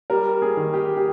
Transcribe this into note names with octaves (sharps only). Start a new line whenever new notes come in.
G3 A#4
G#4
D#3
G4
G4